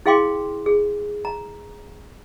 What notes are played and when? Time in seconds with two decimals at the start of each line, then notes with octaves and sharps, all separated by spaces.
0.06 E4 G#4 F5 G5 C6 D6
0.66 G#4
1.25 A#5